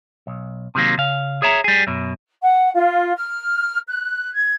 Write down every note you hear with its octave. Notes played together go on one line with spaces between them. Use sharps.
B1
C3 D#3 F#3 A#3
C#3 F5
G#4 C#5 E5 A#5
G3 G#4
F#2 B2
F#5
F4
F6
F#6
G#6